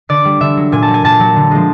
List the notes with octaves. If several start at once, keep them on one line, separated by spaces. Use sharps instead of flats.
D3 D5
G3
D3 E5
F#3
A#2 G#5
A5
F#3
G#5
A#2 A5
F#3
D3
F3 G#3